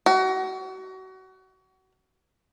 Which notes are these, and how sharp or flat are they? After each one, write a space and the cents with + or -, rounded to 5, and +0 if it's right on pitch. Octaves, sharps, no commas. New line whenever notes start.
F#4 +30